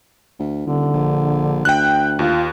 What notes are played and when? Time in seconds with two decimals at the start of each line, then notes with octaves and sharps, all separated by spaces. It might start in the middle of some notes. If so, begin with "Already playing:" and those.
0.39 D2
0.67 D#1 D3
0.94 A#1
1.65 D2 G5 F#6
2.19 D#2 F4